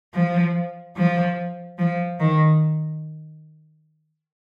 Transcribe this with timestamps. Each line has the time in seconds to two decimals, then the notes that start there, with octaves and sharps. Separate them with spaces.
0.14 F3
0.97 F3
1.78 F3
2.20 D#3